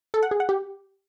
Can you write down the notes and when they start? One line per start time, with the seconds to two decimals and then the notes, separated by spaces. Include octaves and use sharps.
0.14 A4
0.23 F#5
0.31 G#4
0.40 F#5
0.49 G4